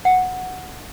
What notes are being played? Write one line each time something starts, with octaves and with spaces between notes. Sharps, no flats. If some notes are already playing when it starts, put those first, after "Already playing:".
F#5